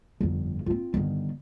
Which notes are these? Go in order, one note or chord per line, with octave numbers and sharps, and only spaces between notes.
G1 F2
C4 F4
G1 D#3